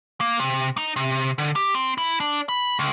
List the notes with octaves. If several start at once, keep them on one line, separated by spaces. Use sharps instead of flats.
A#3
C3
D#4
C3
D3
G4
C4
E4
D4
B5
C#2